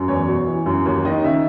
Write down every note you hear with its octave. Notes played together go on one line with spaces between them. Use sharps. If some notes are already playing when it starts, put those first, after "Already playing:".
Already playing: F#2
E2 C#5
B2
E3
F#2
D#2 C#5
D#3 D#5
C#3 E5